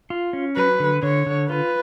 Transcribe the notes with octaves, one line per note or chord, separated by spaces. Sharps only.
F4
C#4
F#3 B4
D3
D3 C#5
D3
F4 B4